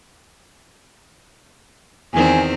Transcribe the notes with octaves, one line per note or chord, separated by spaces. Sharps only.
E2 D#3 C4 G#5